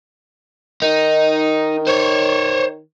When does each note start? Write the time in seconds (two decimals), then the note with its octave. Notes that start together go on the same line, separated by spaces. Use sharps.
0.82 D#3 D#4
1.87 C5 C#5